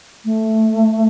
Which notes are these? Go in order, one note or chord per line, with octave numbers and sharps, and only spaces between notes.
A3